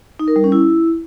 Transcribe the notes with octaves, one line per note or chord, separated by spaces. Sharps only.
D#4
A#4
G3
C#4
E4